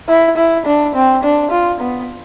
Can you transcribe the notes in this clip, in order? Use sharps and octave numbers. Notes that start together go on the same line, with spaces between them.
E4
E4
D4
C4
D4
F4
B3